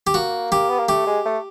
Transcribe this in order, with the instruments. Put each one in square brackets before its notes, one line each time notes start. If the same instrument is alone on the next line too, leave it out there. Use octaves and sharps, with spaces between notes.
[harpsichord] G4
[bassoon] A#3 [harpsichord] F#4
[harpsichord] G4
[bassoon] B3
A#3
[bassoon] A3 [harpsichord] G4
[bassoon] G#3
A3